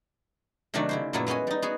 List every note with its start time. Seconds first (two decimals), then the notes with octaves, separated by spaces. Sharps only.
0.74 C3 D#3 F#3 A3 D4 F#4
0.89 C#3 E4 C5
1.13 F#2 A#2 F#3 A3 B3 E4
1.27 G#3 B3 C#4 F#4 G#5
1.47 G3 D#4
1.62 B3 F#4 G#4